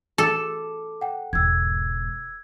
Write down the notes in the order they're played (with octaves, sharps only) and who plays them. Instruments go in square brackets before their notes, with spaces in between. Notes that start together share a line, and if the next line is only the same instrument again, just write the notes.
[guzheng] A4 [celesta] D6
[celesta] F#5 G5
[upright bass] E1 G#2 [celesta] E6 G#6